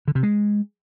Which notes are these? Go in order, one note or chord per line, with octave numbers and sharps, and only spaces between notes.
D3
C3
G#3